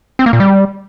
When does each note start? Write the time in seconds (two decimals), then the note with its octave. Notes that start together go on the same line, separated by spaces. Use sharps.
0.19 C4
0.26 A#3
0.33 A#2
0.40 G3